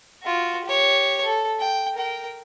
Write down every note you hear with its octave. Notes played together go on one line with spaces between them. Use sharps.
F4 F#4
G4 C#5
A4
G5
A#4 G5